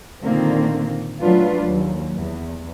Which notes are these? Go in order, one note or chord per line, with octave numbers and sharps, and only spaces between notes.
A#2 D3 D#3 A#3 C4
F#3 A3 D4 F4 B4
D#2 F#3
E2